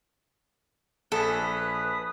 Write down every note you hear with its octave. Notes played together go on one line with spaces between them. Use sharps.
A#1 A4 B4 G#5 D#6